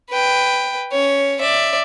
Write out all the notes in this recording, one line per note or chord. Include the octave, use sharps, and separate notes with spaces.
B4 G5
C#4 C#5
D5 E5